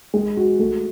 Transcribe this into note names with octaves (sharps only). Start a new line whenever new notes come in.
G#3
F#4
A3